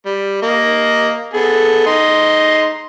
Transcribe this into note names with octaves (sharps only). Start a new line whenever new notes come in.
G3
A#3 D#5
B3 G#4 A4
D#4 D#5 C6